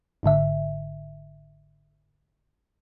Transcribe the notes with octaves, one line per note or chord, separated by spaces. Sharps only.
G1 G#2 D3 E5